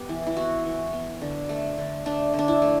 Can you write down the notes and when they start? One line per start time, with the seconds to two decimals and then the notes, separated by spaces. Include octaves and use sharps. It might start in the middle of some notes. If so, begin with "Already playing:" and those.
Already playing: B3 G4
0.09 E3
0.27 E4
0.37 B3 F#4
0.65 E3
0.93 B3
1.21 D3
1.49 A3
1.78 D3
2.06 A3 D4
2.34 D3
2.39 D4
2.48 E4
2.62 A3